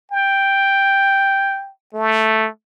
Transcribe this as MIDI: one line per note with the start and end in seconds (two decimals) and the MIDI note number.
0.11 1.70 79
1.94 2.48 57